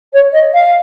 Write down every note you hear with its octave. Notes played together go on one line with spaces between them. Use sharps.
C#5
D#5
F5